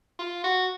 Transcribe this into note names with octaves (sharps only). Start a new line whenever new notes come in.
F4
F#4